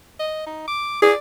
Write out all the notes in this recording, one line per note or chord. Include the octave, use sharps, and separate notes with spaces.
D#5
D#4
D6
G#4 D5